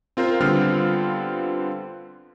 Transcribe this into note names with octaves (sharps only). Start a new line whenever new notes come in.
C4 F4 A#4 C5
D3 G3 B3 C4 F4 F6